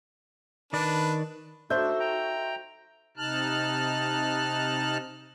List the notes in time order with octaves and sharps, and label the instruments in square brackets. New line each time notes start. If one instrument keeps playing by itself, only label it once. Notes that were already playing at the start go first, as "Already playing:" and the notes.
[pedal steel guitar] D#3 D5 [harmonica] D4 B4
[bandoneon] A3 D4 [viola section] D#4 F#4 A4 [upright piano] C5 G6 [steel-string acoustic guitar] E5
[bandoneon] G5 A#5
[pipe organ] C3 D#4 A5 F6 F#6